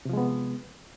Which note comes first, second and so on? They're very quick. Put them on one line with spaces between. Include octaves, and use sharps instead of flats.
C3 F3 G#3 B3